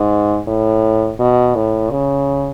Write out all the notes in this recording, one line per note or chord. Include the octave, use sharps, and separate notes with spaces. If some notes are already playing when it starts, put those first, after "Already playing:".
Already playing: G#2
A2
B2
A2
C#3